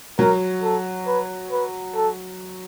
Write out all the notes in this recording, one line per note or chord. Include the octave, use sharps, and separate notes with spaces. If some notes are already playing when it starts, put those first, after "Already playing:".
F#3 A#4
A4
B4
B4
A4